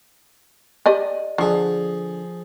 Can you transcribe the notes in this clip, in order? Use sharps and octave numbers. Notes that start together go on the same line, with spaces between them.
G4 D5 D#5
D3 F3 G#4